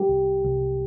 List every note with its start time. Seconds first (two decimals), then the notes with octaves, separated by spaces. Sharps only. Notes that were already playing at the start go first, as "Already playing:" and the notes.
Already playing: G3 G4
0.09 C2
0.44 C2